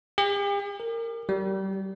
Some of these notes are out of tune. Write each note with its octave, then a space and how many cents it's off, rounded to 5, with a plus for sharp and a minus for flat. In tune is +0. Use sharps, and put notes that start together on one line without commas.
G4 +45
A#4 -20
G3 -25